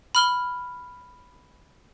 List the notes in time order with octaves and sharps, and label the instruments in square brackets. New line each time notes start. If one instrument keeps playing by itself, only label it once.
[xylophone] B5 F6 G7